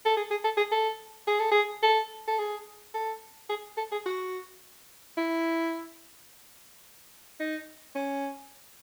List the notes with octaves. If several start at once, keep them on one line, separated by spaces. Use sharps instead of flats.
A4
G#4
G#4
A4
G#4
A4
G#4
A4
G#4
A4
A4
G#4
A4
G#4
A4
G#4
F#4
E4
D#4
C#4